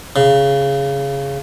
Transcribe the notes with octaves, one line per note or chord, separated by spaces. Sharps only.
C#3